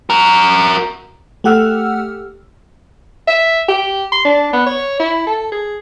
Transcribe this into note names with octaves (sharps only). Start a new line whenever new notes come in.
F#4 A#4
A3 G4 F#5 E6 F6
E5
G4
C6
D4
B3
C#5
E4
A4
G#4